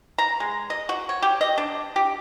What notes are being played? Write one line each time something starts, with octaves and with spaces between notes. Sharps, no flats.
A#5
G#3
D#5
F#4
C#5
G4
D#5
D4
G4